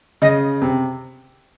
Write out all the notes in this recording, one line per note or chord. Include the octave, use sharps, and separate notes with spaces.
C#3 D#5
C3